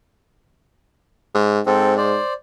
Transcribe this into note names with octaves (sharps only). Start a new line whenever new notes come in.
G#2
G#2 C4 A4
C5 D5